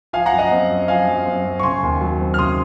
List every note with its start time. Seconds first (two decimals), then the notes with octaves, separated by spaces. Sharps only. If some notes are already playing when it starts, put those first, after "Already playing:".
0.13 F3 F5 G#5
0.26 F#5 A#5
0.33 F#2
0.38 D#5 F#5
0.51 C4
0.70 F#2
0.88 F3 F5 G#5
1.07 F#2
1.26 C4
1.45 F#2
1.59 C#6
1.63 C#3 G#5 C6
1.83 D#2
2.01 F#3
2.20 C4
2.34 F6
2.38 C#3 C6 D#6